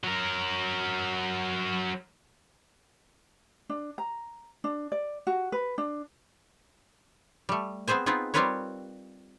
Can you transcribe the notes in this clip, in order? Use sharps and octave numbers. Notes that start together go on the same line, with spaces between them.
F#3 A#4
D4
A#5
D4
D5
F#4
B4
D4
G3 A3
B3 C4 G#4 C5 G#5
B3 C4 D#4 F4 G#4
G3 C4 F4 A#4 B4 C#5